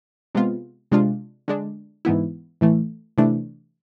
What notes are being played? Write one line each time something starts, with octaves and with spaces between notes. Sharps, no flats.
C3 G#3 B3 F4
C3 G#3 D4 F4
D3 G#3 D4
G#2 E3 B3 E4
A2 E3 A3
C3 E3 A3 D4